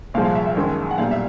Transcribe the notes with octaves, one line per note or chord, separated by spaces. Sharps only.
C2 A#2 F3 G#3 F5
F5
E5
E5
G#1 F#2 D#3 G#3
F#5
B1 A#2 G3 F5
E5